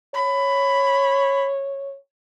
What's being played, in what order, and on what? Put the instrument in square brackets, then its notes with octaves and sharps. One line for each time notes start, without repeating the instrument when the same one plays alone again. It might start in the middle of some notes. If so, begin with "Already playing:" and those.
[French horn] C#5 [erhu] B5